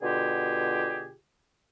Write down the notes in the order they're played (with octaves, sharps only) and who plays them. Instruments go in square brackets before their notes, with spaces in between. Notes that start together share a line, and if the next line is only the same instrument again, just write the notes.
[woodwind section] B2 D3 F4 G4 G#4